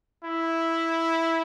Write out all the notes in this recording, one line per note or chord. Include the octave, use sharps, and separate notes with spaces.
E4